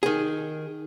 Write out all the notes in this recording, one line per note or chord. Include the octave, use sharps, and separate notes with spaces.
D#3 G#4